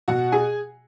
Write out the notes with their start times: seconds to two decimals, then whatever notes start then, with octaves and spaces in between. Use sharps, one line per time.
0.08 B2 F#4 F#5
0.32 G#4 G#5